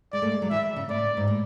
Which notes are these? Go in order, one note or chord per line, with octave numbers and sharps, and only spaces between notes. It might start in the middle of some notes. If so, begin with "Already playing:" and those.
G#3 D5
A3
G#3
F#3
E3 E5
C#3
A2 D5
G#2
A2